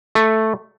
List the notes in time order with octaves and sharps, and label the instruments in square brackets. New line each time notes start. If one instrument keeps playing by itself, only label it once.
[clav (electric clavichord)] A3